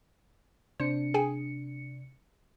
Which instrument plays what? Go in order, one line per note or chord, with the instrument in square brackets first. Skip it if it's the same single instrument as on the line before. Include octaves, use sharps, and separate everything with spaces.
[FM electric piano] C3 D4 C#7 [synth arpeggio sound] C5
[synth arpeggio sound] G#4 G5 G#5